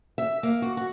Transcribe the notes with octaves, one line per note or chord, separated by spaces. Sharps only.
E5
A#3
F#4
F#4